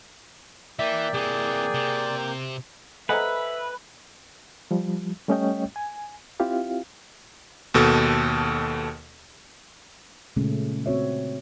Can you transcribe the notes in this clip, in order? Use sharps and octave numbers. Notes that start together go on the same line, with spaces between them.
E3 A#3 D5 E5 G5
C3 E3 G#4
C3
A4 B4 C5 D#5 E5 F#5 G#5 A#5
F3 G3
G3 A3 C#4 C#5 D#5 G5
G#5
C4 E4 F4 G4 F5
D#2 B2 A4
A#2 C#3 G#3 A3 C#4
C4 F#4 C#5 E5